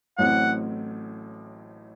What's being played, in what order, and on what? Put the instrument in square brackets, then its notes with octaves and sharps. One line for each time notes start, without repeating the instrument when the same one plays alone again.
[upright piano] A1 A2 F#3 A3 C4 [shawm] F#5